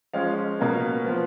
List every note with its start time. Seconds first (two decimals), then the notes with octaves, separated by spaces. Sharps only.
0.13 F3 G#3 C#4 F5
0.59 B2 A#3 C#4
1.05 F3 B3